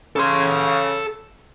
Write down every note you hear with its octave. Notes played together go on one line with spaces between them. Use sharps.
C#3 A4 C6